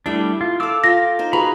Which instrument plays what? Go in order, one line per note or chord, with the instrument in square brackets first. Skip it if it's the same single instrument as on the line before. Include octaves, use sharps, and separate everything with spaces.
[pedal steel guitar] G3 A3 D4 [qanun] E4 G5
[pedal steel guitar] F4
[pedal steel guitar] A4 D6 E6 [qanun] D5 F5
[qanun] F4 G5 [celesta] A#6
[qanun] D#4 C5
[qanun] F#4 G#4 B4 [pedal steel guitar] A#5 B5